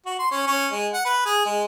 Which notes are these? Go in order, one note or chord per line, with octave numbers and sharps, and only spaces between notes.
F#4
C6
C#4
C#4
G#3
F#5
B4
G#4
G#3